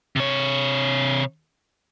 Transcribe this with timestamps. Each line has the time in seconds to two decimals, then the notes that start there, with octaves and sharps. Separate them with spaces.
0.16 C3 C#5